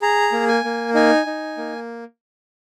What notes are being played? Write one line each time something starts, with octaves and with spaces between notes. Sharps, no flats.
G#4 A#5
A#3
G#5
A#3
D#4 G#5
D#4
A#3